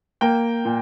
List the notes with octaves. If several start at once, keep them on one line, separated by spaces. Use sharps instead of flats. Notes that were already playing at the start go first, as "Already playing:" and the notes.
A#3 G5
A#2